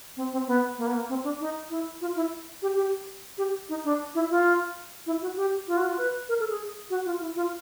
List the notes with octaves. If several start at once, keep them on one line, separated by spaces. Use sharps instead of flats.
C4
C4
B3
A#3
B3
A#3
C4
D4
D#4
E4
F4
E4
G4
G4
G4
D#4
D4
E4
F4
E4
F#4
G4
F4
F#4
F4
B4
A#4
A4
G#4
F#4
F4
E4
F4